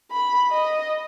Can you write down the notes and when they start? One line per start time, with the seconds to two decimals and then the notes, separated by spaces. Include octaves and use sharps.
0.11 B5
0.51 D#5